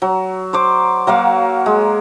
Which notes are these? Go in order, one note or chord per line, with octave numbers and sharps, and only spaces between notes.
F#3
C5 D5 D6
F#3 A#3 F5 F#5
G#3